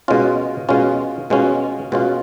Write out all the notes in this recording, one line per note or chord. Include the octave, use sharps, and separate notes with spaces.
B2 G#3 C#4 F4
B2 G#3 C#4 F4
B2 G#3 C#4 F4
B2 G#3 C#4 F4